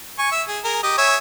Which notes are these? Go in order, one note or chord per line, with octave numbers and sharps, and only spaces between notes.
G#5 C#6
E5
G#4
G#4 A#4
G4 D#5
C#5 E5 G#5